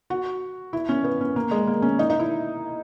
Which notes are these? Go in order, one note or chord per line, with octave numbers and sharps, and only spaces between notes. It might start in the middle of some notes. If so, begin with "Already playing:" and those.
F#4
E4
C#4
B3
C#4
A#3
G#3
A#3
C#4
D#4
D#4
E4